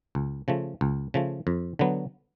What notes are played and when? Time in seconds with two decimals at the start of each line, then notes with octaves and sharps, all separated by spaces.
0.15 C#2
0.48 C#3 F3 A3
0.81 C#2
1.14 C#3 F3 A3
1.47 F2
1.79 D3 F#3 B3